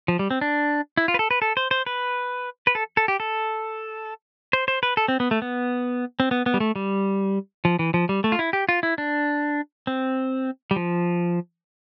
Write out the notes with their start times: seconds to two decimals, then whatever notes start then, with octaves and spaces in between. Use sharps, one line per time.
0.08 F3
0.19 G3
0.31 C4
0.41 D4
0.97 E4
1.08 F4
1.14 B4
1.19 A4
1.31 B4
1.42 A4
1.57 C5
1.71 C5
1.86 B4
2.67 B4
2.75 A4
2.97 A4
3.08 G4
3.20 A4
4.53 C5
4.68 C5
4.83 B4
4.97 A4
5.08 C4
5.20 B3
5.31 A3
5.42 B3
6.20 C4
6.31 B3
6.46 B3
6.54 G3
6.60 A3
6.76 G3
7.65 F3
7.79 E3
7.94 F3
8.09 G3
8.24 A3
8.32 F4
8.39 E4
8.53 G4
8.69 F4
8.83 E4
8.98 D4
9.87 C4
10.71 G3
10.76 F3